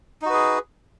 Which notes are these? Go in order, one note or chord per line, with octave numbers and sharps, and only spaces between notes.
D#4 F#4 G#4 B4